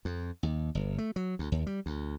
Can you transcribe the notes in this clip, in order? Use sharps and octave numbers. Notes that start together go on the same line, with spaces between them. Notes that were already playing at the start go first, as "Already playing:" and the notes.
F2
D#2
G1
A3
F#3
D2
D#2
G3
D2